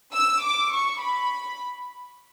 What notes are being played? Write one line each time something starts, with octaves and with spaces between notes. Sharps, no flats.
E6
D6
C#6
B5